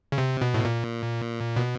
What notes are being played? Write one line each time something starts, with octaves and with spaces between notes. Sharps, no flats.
C#3
C3
B2
A2
A#2
B2